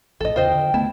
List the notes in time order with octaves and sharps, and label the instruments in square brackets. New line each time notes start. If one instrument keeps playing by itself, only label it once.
[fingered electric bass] A#1 A2 [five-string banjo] A4 D#5
[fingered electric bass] E2 C#3 [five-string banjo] F4 C5 D#5 [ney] G5
[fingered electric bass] D3
[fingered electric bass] D2 A3 B3 [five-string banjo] E4 A5